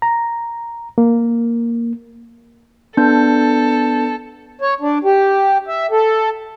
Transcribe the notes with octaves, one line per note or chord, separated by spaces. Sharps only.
A#5
A#3
B3 D4 A4 G6
C#5
D4
G4
E5
A4